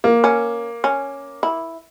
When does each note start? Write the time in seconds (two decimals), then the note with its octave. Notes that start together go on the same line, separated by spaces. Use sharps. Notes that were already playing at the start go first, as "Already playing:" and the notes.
0.04 A#3
0.24 C#4
0.84 C#4
1.43 E4